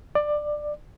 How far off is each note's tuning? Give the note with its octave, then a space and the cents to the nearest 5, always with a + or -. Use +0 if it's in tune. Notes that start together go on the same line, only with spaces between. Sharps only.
D5 +15